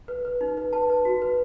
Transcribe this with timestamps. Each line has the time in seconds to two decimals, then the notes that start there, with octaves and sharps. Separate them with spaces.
0.08 B4
0.25 B4
0.41 D#4
0.57 B4
0.73 B4 A5
0.90 B4
1.05 F#4
1.22 B4